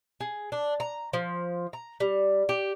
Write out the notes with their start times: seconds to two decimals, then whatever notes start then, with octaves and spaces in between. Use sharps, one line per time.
0.20 G#4
0.52 D4
0.80 A#5
1.13 F3
1.73 A#5
2.00 G3
2.49 G4